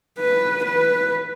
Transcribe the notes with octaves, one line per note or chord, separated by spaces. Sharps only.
B4
B4